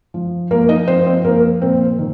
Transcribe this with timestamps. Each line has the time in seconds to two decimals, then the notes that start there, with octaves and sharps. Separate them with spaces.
0.14 F3
0.51 F3 A#3 A#4
0.69 D#4 D#5
0.88 F3 C4 C5
1.06 C4 C5
1.24 F3 A#3 A#4
1.61 A#2 C4 C5
1.98 D#3